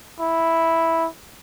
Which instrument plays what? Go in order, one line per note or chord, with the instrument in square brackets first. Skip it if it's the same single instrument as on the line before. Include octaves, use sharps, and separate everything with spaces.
[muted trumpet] E4